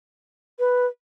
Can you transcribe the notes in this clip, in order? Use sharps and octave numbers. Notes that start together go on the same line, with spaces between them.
B4